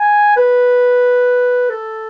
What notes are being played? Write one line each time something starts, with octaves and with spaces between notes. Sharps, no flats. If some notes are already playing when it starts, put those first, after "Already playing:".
Already playing: G#5
B4
A4